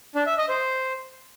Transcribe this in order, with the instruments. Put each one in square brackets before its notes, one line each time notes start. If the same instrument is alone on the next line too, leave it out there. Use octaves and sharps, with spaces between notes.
[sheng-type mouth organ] D4
E5
D#5
C5